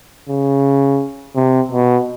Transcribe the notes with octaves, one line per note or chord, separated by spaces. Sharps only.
C#3
C3
B2